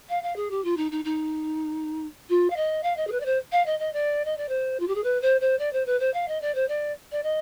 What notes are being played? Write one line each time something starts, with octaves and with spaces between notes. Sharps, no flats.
F5
F5
G#4
G4
F4
D#4
D#4
D#4
F4
F5
D#5
F5
D#5
G#4
B4
D5
C5
F5
D#5
D#5
D5
D#5
D5
C5
F4
G4
G#4
B4
C5
C5
D5
C5
B4
C5
F5
D#5
D5
C5
D5
D5
D#5